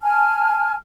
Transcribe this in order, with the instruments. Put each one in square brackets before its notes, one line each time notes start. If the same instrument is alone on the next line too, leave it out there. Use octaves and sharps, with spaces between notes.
[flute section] G#5 A5 F6